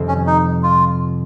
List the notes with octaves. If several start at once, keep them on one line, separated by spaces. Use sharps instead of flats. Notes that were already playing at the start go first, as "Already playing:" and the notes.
Already playing: F2 C3 D#3 G3 C4
C#4
D#4
F4